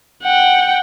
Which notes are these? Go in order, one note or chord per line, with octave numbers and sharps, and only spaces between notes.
F#5 G5